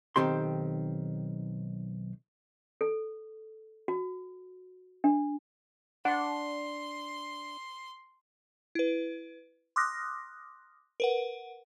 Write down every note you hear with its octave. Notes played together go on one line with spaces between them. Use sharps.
B1 D#3 C4 G4 C6
A4
F#4
D4
D4 F#5 C6
E4 B4
C6 D6 D#6 F6 F#6 A#6
A#4 B4 F#5